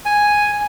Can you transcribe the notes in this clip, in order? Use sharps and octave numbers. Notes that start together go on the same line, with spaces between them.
G#5